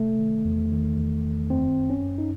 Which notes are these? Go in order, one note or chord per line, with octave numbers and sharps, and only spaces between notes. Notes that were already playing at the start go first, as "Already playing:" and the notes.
Already playing: C3 A3
D#3
E2
D#3
E2
D#3
F#2 C4
F#2
C#4
F#2
D#4